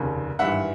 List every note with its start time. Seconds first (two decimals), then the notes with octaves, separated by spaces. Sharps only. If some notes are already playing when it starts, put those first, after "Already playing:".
Already playing: F1 D#2 C#3
0.39 G#1 G2 E3 E5 F#5